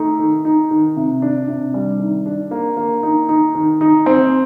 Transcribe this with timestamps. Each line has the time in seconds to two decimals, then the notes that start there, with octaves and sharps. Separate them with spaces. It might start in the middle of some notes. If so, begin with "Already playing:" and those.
Already playing: A3 D#4
0.19 D#3
0.45 D#4
0.71 D#3
0.97 C3
1.22 D4
1.48 C3
1.74 G3
2.00 D#3
2.26 D4
2.51 A#3
2.77 A#3
3.03 D#4
3.29 D#4
3.55 D#3
3.81 D#4
4.06 C4